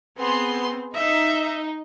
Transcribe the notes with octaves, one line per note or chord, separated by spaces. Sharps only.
B3 C4 G#4 C6
D#4 E5